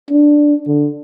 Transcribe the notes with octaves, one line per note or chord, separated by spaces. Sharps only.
D4
D3